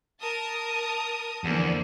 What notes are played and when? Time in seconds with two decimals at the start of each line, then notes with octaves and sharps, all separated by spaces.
0.19 A#4 A5 D#6
1.44 E2 D3 F3 A#3